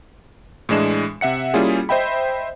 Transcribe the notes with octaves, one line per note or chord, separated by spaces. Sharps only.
A2 E3 G#3 D4 E7
C3 E5 F#5 C#7
G3 A#3 C#4 E4 F4 G#4
C5 D#5 E5 G5 B5